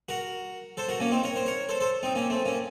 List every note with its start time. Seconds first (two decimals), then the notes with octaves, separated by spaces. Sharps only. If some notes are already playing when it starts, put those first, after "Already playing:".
0.09 F#4 A#4
0.77 A4 C5
0.89 F#4 A#4
1.00 A#3 C#4
1.11 C4 D#4
1.23 A#4 C#5
1.36 C5
1.46 A#4 C#5
1.69 A4 C5
1.80 A4 C5
2.03 C4 D#4
2.15 A#3 C#4
2.30 A3 C4
2.45 A#3 C#4